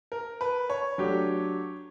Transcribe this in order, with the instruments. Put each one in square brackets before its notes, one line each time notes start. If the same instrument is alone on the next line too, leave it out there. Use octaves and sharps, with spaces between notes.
[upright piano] A#4
B4
C#5
[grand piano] F#3 A3 D4 G4